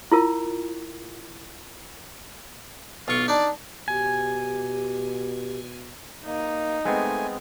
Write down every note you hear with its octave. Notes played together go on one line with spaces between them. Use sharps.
E4 F4 A#4
B1 F4 C#6
D4 D#4 D5
B2 G4 G#5
A#3 D#4
G#3 A3 B3 C4 G#5